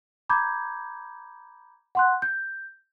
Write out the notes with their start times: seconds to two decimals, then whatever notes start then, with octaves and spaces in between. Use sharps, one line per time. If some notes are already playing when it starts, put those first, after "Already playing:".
0.29 A#5 B5 D6 G6 G#6
1.95 F#5 C6 F#6
2.22 G6